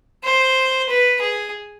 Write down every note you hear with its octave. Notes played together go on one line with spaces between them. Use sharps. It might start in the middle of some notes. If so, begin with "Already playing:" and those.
C5
B4
G#4